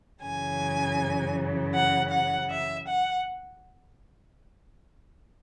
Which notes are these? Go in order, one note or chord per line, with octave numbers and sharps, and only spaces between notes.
F#2 C#3 E3 G#5
F#5
F#5
E5
F#5